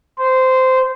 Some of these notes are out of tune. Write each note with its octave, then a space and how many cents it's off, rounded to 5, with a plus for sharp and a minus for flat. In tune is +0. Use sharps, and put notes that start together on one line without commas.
C5 -15